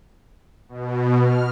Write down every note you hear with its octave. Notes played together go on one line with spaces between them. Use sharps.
B2
F6